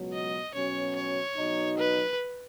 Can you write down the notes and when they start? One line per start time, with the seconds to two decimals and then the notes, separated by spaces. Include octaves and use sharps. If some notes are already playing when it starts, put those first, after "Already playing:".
Already playing: C#2 B2 F#3
0.13 D#5
0.54 B2 F#3 C#4 C#5
0.95 C#5
1.37 B2 F#3 D#4
1.78 B4